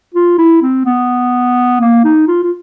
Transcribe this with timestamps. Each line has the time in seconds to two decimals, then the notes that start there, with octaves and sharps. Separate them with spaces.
0.14 F4
0.38 E4
0.62 C4
0.86 B3
1.81 A#3
2.04 D#4
2.28 F4
2.43 F4